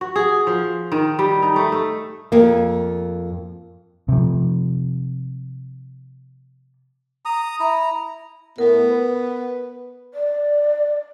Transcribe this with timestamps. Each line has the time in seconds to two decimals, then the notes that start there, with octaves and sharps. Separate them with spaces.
0.01 F#4
0.16 G#4
0.47 F3
0.92 D#3
1.19 G3
1.42 D#4
1.56 A3
1.72 A3
2.32 F2 A#3
4.08 C3 F3
7.25 A#5 D#6
7.60 E4 A#5
8.58 A2 B3 A#4
8.90 B4
10.14 D5